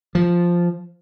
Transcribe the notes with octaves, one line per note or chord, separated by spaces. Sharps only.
F3